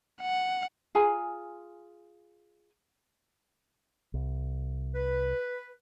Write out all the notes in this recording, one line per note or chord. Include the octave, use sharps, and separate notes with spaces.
F#5
F4 G#4 G#5 A#5
C2
B4